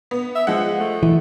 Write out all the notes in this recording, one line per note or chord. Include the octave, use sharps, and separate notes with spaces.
B3
E5
F3 G#3 F#5
A3
E3